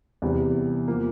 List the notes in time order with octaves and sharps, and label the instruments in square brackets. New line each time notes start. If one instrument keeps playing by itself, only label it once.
[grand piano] E2 C3 E3 G3
F3 A#3